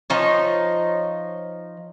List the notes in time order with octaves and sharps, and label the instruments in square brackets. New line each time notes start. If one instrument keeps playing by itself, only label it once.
[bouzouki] F3 D#4 C#5